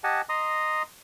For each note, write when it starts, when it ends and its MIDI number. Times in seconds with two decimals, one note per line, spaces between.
0.04 0.21 67
0.04 0.21 75
0.04 0.21 78
0.04 0.21 80
0.04 0.21 81
0.29 0.83 75
0.29 0.83 82
0.29 0.83 84
0.29 0.83 87